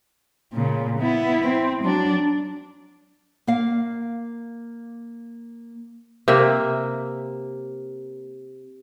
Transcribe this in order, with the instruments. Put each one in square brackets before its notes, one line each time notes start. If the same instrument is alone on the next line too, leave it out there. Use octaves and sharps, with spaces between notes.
[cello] A#2 C#3
B3 E4
C4
F#3 D4
[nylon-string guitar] A#3 F5
[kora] C3 A#3 E5